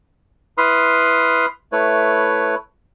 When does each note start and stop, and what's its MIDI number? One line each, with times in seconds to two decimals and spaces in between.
0.58 1.46 64
0.58 1.46 71
0.58 1.46 83
0.58 1.46 84
0.58 1.46 87
0.58 1.46 89
1.72 2.55 57
1.72 2.55 64
1.72 2.55 71
1.72 2.55 73